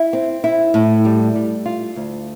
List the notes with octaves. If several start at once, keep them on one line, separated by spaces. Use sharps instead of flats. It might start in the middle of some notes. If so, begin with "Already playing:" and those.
Already playing: E4
C4
E4
A2
G3
G3
F4
D2